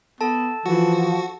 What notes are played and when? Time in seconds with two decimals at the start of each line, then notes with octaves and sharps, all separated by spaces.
0.21 B3 A4 A5
0.66 E3 F3 F#4